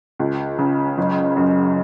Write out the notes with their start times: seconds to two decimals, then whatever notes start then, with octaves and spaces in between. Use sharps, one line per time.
0.19 C#2
0.58 C#3
0.98 F#1
1.36 F#2